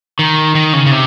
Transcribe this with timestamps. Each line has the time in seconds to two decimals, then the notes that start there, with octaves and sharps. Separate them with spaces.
0.19 D#3
0.55 D#3
0.73 C#3
0.86 C#3
0.91 C3